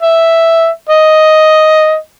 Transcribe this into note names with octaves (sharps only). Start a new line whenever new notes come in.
E5
D#5